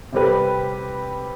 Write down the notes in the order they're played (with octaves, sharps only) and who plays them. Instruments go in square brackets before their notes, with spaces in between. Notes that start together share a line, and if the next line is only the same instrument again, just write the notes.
[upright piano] C3 G3 C4 G4 B4